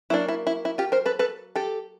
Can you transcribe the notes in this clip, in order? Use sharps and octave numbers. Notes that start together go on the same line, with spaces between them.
F#3 A#3 D4 E4
E4
E4
E4
F4 G4
A#4 C5
A4 B4
A4 B4
G4 A4